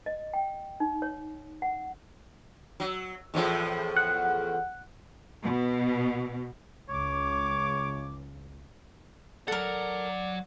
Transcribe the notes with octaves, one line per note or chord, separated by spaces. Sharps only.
D#5
G5
D#4
C#5
F#5
F#3
E2 A2 F3
F#5
B2
C#2 C#5 D6
F#3 A4 A#4 D5 F#5